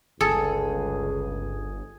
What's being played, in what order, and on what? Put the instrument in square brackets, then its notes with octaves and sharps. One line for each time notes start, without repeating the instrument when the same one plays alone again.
[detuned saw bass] G1 [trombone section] C#2 [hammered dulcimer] G#4 [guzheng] A4